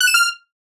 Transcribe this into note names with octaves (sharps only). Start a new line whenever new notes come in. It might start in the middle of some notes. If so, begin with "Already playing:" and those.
F#6
E7
F6